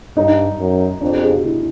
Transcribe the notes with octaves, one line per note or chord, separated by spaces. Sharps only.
G2 D#4
F#2
F2 D4
G4
G#4
F#4
E4